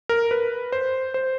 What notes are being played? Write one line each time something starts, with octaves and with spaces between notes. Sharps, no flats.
A#4
B4
C5
C5